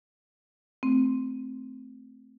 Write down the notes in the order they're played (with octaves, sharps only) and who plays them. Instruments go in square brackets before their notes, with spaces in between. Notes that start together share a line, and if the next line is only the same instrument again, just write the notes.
[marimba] A3 C4